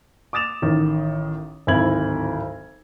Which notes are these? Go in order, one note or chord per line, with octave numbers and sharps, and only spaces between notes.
D6 D#6 A6 E7 F7
A1 D#3
D1 G#1 E4 G#6 F#7